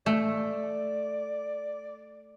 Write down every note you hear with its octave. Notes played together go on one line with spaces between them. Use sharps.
A3 D5